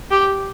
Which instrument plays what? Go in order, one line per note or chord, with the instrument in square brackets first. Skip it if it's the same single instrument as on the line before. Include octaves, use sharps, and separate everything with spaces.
[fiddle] G4